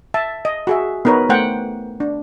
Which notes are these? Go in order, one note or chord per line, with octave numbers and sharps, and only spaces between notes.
E5 A5
D#5
F#4 G#4 E5
B3 D#4 A#4 B4 C#5
A3 C5 F#5 G5
D4